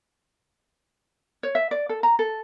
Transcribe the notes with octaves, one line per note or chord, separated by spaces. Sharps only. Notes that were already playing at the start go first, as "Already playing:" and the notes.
C#5
E5
D5
A4
A#5
A4